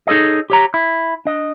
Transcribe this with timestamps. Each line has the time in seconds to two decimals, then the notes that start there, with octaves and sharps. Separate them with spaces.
0.07 D#4 G#4 A4 C#5 D#5
0.50 G4 C#5 A#5
0.74 E4
1.25 D4 D#5